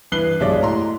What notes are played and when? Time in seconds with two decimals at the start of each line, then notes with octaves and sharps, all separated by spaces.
0.12 G2 E3 B4 F#6 C7 G7
0.40 B1 G#3 C#5 D5
0.61 A2 A#5 C6